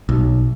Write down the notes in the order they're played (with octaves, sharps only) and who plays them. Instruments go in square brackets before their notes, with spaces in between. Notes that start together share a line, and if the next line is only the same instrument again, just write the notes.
[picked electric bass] B1